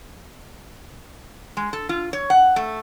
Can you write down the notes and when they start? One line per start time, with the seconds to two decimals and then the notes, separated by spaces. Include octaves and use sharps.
1.57 G#3
1.73 A4
1.89 F4
2.13 C#5
2.30 F#5
2.56 A3